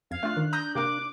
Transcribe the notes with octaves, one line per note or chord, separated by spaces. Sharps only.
F2 F5 G#6
A3 D4 F4 F#6
D#3
A#5 D#6 G6 A#6
C3 A#3 A#4 D6